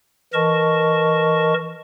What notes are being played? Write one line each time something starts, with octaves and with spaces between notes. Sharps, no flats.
E3 A#4 D#5 A5 C#6